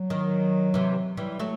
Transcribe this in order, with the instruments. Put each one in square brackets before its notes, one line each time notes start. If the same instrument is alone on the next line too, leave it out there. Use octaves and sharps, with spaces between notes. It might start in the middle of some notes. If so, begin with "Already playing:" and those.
Already playing: [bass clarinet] F#3
[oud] D#3
C3 E3
E3 G3
F#3 A3